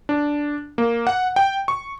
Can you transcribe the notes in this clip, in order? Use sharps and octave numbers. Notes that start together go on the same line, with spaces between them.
D4
A#3
F#5
G5
C#6